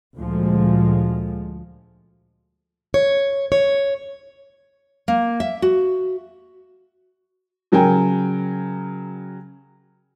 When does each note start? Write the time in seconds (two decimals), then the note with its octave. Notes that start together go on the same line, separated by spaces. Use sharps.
0.17 D2 A#2 F3 G#3
2.94 C#5
3.52 C#5
5.08 A#3
5.40 E5
5.62 F#4
7.72 C#3 F#3 A#4 G5 G#5